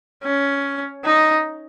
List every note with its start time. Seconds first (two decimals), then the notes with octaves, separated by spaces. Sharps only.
0.23 C#4
1.05 D#4